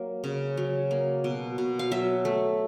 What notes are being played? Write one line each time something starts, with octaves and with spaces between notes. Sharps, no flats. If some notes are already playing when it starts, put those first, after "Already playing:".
Already playing: F#3 A#3
C#3
F#3
A#3
B2
B2
F5
F#3 E5
A3